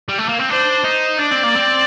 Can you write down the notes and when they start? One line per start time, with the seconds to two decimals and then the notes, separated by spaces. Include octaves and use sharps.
0.09 G3
0.19 A3
0.29 A#3
0.40 C4
0.50 D4 C5
0.84 D#4
1.19 D4 D5
1.31 C4
1.43 A#3
1.56 C4